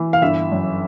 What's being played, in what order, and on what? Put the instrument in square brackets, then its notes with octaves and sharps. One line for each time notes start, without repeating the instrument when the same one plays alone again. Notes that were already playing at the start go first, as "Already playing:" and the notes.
Already playing: [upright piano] E3
F5
G1 E5
F#2